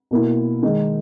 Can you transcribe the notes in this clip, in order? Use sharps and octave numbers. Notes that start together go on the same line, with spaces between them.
B2 A#3 E4
D#3 G#3 D#4